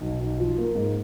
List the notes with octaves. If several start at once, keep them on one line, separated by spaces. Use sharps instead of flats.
B1
B1
F3
A#3
G#2